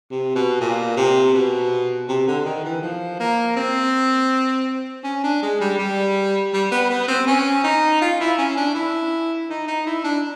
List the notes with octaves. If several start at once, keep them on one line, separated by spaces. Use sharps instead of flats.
C3
B2
A#2
C3
B2
C3
D3
D#3
E3
F3
A#3
C4
C#4
D4
G#3
G3
G3
G3
B3
B3
C4
C#4
D#4
F4
E4
C#4
D4
E4
D#4
D#4
E4
D4